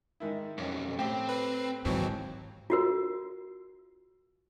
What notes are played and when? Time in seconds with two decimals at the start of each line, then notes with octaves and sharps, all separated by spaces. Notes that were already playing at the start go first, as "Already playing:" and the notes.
0.20 G#2 D#3 E4
0.58 B1 F2 C#4
0.99 A2 C4 G4 G5
1.29 B4
1.85 D#2 G#2 E3 F#3 C4
2.70 F4 F#4 A#4